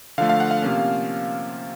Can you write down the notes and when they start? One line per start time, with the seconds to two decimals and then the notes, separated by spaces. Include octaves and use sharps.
0.18 D3 F3 A3 F5
0.29 F5
0.40 F#5
0.51 F5
0.62 C3 F3 A#3 C#4